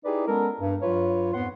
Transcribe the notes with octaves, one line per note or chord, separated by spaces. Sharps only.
D#4 E4 G4 G#4 B4 D5
G#3 B3 C#4 A4 A#4
G2
G2 F#3 F4 B4 C#5
F2 G#2 B3 F#5 C6